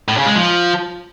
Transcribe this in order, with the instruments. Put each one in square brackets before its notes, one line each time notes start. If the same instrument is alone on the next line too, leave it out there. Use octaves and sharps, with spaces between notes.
[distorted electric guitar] A2
C#3
G#3
F3